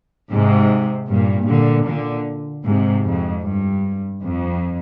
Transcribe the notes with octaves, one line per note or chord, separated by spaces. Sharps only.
G#2 C3
G2 A#2
A#2 D3
A#2 D3
G#2 C3
F2 G#2
G2
F2